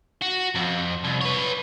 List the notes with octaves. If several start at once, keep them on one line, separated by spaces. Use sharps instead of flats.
F#4
F2
C2
B4 C#5